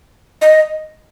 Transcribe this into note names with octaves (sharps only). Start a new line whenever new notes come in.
D#5